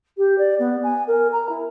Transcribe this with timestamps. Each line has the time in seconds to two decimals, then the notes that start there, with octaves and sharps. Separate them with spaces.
0.17 G4
0.38 D5
0.59 B3
0.83 G#5
1.07 A#4
1.32 A#5
1.49 E4